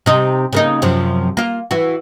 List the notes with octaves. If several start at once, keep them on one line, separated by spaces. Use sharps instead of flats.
C3 D#4
C#3 A#3 D#4
F#2 C3 F3
A#3 F4
E3 F#4